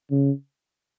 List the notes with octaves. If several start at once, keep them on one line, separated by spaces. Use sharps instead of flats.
C#3